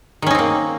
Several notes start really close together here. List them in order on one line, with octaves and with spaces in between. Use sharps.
D#3 C#4 D#4 C4 A#3